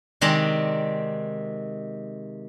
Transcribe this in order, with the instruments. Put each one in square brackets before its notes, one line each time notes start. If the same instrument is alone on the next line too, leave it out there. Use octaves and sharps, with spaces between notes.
[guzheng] C3 D#3 G#3 C4 D5 A#5